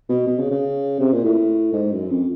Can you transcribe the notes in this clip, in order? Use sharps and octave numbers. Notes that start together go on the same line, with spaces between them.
B2
B2
C#3
C#3
C3
A#2
A2
G#2
F#2
F2